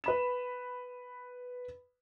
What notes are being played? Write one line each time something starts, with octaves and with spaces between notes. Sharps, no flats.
B4 B5 E7